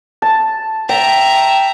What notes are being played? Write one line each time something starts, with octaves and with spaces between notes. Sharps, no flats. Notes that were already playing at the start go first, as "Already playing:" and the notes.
A5
E5 G5 A#5